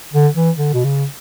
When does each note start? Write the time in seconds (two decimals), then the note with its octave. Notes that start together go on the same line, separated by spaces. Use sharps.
0.13 D3
0.35 E3
0.56 D3
0.74 B2
0.84 C#3